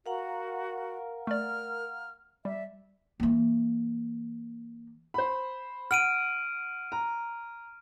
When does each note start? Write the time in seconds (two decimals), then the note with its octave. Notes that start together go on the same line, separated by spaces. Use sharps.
0.06 F#4 A#4 F5 F#5 A#5
1.27 A3 D5 F6
2.45 G3 D5 E5
3.20 E3 A#3
5.14 C5 B5
5.91 F#5 F6 D7 D#7
6.92 A#5